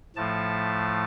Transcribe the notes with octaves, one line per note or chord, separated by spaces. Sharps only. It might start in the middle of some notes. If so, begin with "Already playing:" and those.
A2 F3 A3 A5